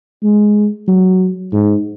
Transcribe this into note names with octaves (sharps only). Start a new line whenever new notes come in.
G#3
F#3
G#2